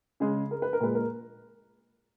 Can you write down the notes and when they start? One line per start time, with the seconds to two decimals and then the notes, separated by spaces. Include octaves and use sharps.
0.20 C#3 G#3 G#4
0.51 A#4
0.62 B4
0.73 A#4
0.80 A#2 G#3 B4
0.95 A#4